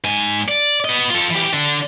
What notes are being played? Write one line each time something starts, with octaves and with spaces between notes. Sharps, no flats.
G#2 G#5
D5
B3 D#5
F4 A4
E3 G4
D3 D4